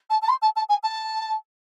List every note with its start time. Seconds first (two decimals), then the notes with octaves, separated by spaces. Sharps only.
0.10 A5
0.22 A5
0.28 C6
0.42 A5
0.56 A5
0.69 G#5
0.83 A5